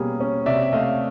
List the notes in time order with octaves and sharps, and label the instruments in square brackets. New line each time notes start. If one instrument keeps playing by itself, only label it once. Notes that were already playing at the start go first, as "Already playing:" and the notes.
Already playing: [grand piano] B2 G3 A#3 C#4 G#4
C#4
C3 D5 E5
A3 D#5 F5